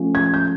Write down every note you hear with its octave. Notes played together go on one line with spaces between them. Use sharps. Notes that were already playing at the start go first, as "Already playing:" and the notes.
Already playing: F3 A3 C#4 F4
G#6
G6